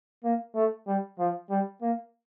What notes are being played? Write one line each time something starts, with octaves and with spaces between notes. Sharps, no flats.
A#3
A3
G3
F3
G3
A#3